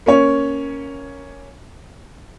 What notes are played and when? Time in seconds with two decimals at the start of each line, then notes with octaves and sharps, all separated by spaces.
0.06 A#3 C#4 C#5